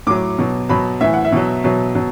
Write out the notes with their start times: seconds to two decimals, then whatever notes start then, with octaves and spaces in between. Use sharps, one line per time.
0.07 A2 F#3 D6
0.38 B2 F#3
0.69 B2 F#3 B5
1.01 A2 E3 E5
1.13 F#5
1.25 E5
1.32 B2 F#3
1.64 B2 F#3
1.95 B2 F#3